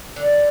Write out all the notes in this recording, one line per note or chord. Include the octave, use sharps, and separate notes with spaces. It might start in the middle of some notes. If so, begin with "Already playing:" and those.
D3